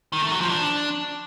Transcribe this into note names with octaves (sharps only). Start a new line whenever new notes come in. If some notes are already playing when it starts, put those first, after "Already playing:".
D#3
A3
F#3
F3
D4